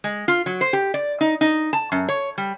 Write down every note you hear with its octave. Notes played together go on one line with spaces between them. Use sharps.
G#3
F4
F#3
C5
G4
D5
D#4
D#4
A5
F#2
C#5
G3